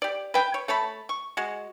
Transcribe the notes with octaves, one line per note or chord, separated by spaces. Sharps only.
G4 D5
B4 G5
C#5
A3 C#5 A5 B5
C#6
G#3 F#4